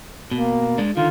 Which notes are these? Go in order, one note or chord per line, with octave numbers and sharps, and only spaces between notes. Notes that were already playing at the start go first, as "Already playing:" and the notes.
B2 A#3
G#3 D4
D3 D#3 F4